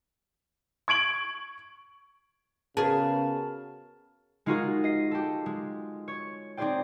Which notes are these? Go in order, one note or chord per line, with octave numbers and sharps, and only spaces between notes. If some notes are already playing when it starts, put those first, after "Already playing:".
C#6 G#6 D7 F#7
C#3 B3 F#4 G#4 A#4 A5
G#3 D#4 F4 F#4 G#4 A#4
D#5 C7
G4 A4
G#3
C#5
C4 D#4 G#4 C5 D5 G5